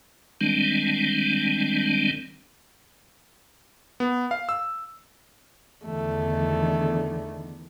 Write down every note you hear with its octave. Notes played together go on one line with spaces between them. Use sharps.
D#3 G3 G#3 C4 D4
B3
F5
E6
E2 D3 D#3 A3